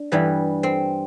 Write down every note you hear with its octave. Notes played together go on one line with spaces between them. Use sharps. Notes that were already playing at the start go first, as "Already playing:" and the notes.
Already playing: D4
G2 E3 G3 B3
C4